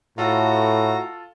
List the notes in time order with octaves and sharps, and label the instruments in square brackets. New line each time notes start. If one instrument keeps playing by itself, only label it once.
[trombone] A2 [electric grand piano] F4 A4 [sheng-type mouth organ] F#4 A#5